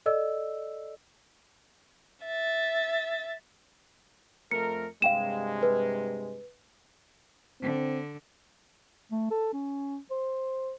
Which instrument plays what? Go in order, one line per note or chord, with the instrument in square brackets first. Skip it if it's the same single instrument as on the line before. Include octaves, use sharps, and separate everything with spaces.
[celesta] A4 D5 D#5 E6
[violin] E5 A6
[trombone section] F2 A3 A#4 [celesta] C#7
[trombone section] G2 C3 G#3 [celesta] F5 G5 E7
[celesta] B4
[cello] D3 [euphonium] C4
[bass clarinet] A3
A4
C#4
C5